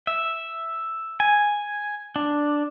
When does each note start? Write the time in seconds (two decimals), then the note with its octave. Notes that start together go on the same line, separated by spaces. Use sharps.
0.07 E5
1.20 G#5
2.16 D4